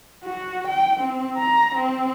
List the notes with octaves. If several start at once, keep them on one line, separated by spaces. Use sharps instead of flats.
F#4
G5
C4
A#5
C4